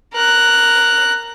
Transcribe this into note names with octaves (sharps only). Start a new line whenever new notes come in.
A#4 F#6